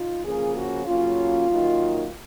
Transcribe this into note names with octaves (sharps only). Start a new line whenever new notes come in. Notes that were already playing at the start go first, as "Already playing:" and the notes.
Already playing: D#4 F4
C#3 F3 A#3 C#4 G#4
F#4
C#3 F#3 A#3 C#4 F4
F#2 D#3 A#3 D#4